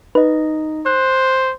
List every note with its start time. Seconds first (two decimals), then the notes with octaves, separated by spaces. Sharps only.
0.15 D#4 B4 D#5
0.86 C5 F#6